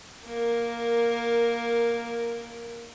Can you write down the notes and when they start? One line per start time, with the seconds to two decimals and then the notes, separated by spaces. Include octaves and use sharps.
0.24 A#3 A#4